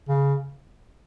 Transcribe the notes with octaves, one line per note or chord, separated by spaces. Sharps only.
C#3